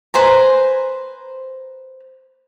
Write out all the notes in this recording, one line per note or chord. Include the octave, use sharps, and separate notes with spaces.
B4 C5 G#5 A#5